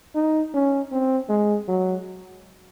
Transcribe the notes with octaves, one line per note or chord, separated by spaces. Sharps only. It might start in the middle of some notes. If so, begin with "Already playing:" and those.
D#4
C#4
C4
G#3
F#3